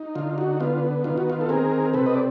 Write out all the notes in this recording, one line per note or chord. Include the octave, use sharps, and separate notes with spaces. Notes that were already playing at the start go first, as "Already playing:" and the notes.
Already playing: D#4
D3 F4
F#4
B3 F4
D#3 F4
F#4
F4
A4
C4 G#4 A#4
C3 A4 B4
D#5
D5